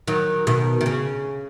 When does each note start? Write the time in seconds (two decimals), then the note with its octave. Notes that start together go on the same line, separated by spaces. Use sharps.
0.07 D#3 F#3
0.47 B2 D#3
0.81 D#3
0.86 C#3